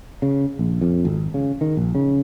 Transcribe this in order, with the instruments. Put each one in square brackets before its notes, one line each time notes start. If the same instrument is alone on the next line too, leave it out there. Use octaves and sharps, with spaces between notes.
[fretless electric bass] C#3
A#1
F2
G#1
C#3
D#3
A#1
C#3